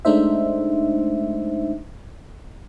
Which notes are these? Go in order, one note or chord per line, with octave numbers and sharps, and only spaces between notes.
G#3 A3 D4 D#4 C5 E5